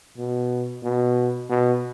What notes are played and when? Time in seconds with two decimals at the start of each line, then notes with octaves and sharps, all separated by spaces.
0.17 B2
0.83 B2
1.49 B2